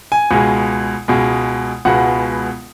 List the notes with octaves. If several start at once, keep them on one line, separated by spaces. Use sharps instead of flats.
G#5
C#2 B2 G#3
C#2 B2 G#3
C#2 B2 G#3 B3 F#5